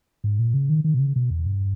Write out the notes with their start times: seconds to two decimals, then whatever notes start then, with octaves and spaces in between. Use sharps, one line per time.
0.24 G#2
0.39 A#2
0.54 C#3
0.69 D#3
0.84 D#3
0.94 B2
0.99 C#3
1.16 B2
1.30 E2
1.46 G2